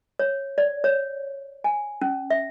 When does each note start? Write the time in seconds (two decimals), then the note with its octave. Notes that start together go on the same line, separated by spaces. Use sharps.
0.19 C#5
0.58 D5
0.84 C#5
1.64 G#5
2.02 C#4
2.30 E5